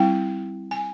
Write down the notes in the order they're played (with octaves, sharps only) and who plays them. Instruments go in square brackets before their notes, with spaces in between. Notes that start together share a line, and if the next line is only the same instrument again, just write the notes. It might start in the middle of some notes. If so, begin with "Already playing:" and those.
Already playing: [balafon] G3 C4 E4 G5
G#5